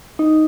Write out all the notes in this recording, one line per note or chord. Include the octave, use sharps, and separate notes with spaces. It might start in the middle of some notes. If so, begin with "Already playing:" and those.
D#4